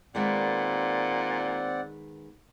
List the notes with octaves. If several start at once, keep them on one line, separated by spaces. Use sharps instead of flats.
A#2 D#3 G#3 B3 C4 D5 F#5